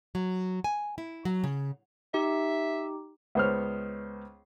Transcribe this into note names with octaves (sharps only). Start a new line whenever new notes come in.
F#3
G#5
E4
F#3
C#3
D#4 G4 E5
C#2 B3 C5 C#5 F6